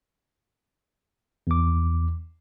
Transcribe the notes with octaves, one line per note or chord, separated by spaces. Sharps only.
E2 D6